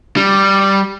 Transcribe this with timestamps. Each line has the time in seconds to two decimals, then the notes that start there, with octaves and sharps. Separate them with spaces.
0.16 G3